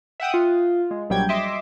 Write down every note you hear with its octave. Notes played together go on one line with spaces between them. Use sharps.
E5 F#5 G5 D#6
F4
G#3
A#1 F#3 G3 G5 G#6
D#5 E5 C6 D6